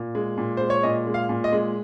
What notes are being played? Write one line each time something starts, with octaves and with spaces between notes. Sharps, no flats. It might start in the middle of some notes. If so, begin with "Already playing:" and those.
Already playing: A#2
G#3
A#2
G#3 C5
C#5
A#2 D#5
G#3
F5
A#2
D#5
G#3